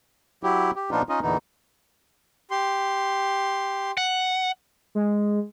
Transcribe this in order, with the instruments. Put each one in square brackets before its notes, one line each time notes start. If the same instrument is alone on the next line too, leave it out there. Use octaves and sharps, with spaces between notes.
[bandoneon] F#3 E4 G4
G4
A#2 F3 B3 D4 D#4 F4
C#4 D#4 F4 D#5
E2 A#2 D3 E3 B3 D#4
[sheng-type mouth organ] G4 C6
[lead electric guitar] F#5
[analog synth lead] G#3